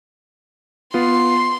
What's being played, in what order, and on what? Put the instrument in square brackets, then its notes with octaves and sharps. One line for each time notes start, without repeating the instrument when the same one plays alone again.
[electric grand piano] B3 F4 [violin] C6